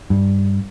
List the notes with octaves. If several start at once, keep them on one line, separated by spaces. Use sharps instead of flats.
G2